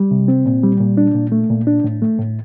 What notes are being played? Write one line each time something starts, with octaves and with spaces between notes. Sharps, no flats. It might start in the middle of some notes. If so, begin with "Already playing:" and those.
Already playing: G3
C3
C4
A#2
G3
A#2
D4
A#2
A3
A#2
D4
A2
A3
A2